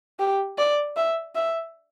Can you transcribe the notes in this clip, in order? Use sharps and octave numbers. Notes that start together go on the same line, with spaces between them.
G4
D5
E5
E5